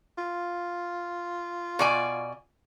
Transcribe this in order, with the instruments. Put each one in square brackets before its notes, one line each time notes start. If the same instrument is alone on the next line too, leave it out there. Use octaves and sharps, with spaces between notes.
[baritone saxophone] F4
[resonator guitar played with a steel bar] B2 D5 G#5